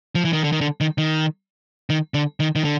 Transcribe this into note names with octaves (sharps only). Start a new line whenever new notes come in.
F3
E3
D#3
D3
D#3
D3
D#3
D#3
D#3
D3
D#3
D#3
D3